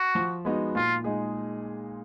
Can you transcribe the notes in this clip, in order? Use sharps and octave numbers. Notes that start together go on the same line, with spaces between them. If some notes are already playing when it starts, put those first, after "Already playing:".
Already playing: F#4
F3
G#3 B3 D#4 F#4
A#2 F4
G#3 D#4 G#4